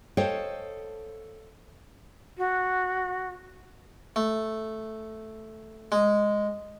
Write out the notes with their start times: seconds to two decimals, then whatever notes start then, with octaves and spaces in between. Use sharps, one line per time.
0.17 A4 C5 C#5 D#5 F5 G5
2.38 F#4
4.16 A3
5.92 G#3